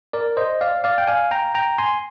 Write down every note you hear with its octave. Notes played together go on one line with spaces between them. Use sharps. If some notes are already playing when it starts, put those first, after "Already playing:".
A#4 D5
C5 D#5
D5 F5
D5 F5
G5
F5 G#5
G5 A#5
G5 A#5
G#5 C6